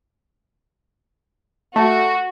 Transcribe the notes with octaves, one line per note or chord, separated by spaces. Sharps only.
A3 F#4